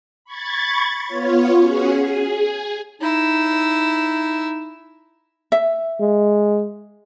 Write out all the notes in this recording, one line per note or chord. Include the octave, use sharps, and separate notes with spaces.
B5 C#6 G#6 A6
B3 F4 C#5
C#4 F#4 G#4
G#4
D#4 E4 E6
E5
G#3